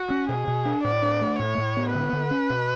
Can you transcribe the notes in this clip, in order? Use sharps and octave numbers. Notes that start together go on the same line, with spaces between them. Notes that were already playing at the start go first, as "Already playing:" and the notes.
Already playing: F#4
C#4
B2 G#4
B2
D4
A2 D5
D4
A3
A2 C#5
A2
B3
D3 B4
D3
C#4
B2